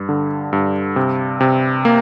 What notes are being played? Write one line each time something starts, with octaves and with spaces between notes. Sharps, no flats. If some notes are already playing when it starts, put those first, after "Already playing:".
Already playing: G2
D3
G2
C3
C3
A#3